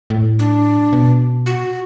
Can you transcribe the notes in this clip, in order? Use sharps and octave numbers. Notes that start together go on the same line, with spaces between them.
A2
D4
B2
F#4